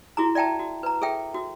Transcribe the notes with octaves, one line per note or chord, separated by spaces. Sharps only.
E4 F#4 G#4 A#5
D5 E5 G5 A5 A#5
F#4
B4 A#5
G#4 A4 E5 G5
F#4